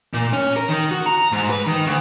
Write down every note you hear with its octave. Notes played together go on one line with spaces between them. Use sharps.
A#2
C#4
A#4
D#3
F#4
A#5
G#2
B4
D#3
D2